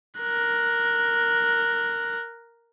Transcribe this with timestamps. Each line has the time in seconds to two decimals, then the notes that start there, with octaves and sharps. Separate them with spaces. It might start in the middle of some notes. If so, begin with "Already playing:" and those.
0.20 A#4 F#6